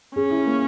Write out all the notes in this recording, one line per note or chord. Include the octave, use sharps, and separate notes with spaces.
C#4 G#4
E4
A#3